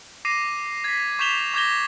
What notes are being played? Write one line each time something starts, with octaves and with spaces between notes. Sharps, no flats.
D6 A#6 C7 D#7
G#6 A#6 B6
C#6 G6 B6 E7 F7 G7
C#6 D6 G6 G#6 A#6 G7